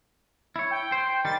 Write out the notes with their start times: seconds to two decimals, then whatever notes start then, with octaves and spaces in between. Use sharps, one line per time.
0.56 E4 C#5
0.71 G5
0.92 C5
1.25 D#3 G3 A6